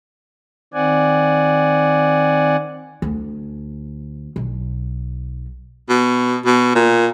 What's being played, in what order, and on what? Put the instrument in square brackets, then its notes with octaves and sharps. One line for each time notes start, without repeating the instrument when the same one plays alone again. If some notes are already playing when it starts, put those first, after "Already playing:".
[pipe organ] D#3 C4 D5 F#5 G#5
[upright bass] D2
B1
[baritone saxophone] B2
B2
A#2